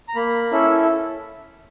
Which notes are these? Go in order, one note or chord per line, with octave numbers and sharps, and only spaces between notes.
A#5
A#3 B5
C#4 E4 A4